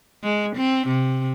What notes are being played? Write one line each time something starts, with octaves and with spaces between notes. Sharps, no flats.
G#3
C4
C3